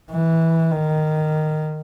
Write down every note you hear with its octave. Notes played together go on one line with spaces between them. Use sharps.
E3
D#3